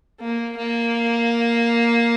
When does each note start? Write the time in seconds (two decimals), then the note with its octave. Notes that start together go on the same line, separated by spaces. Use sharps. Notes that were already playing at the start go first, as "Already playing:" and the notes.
0.20 A#3
0.57 A#3